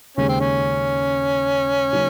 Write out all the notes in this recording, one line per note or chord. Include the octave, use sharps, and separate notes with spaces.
D#2 C#3 G#3 C#4
C4
C#4
C#3 F#3 A#3 D#4